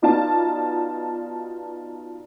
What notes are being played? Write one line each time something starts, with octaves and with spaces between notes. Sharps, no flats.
B3 D#4 F4 F#4 D5 A5